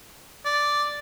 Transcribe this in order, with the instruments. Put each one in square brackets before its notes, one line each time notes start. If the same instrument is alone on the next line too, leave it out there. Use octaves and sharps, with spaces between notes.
[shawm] D5